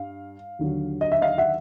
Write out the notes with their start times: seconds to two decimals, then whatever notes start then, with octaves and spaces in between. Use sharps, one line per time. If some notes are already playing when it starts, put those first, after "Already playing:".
Already playing: G2 F5
0.59 D#2 D3 F#3
1.01 D#5
1.12 E5
1.21 D#5 F5
1.38 E5 F#5